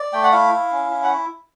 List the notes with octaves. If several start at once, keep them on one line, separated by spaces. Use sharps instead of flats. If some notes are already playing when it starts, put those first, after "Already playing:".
Already playing: D5
A3 G5
F#5
E4 F5
E4
C#4
E4
F#5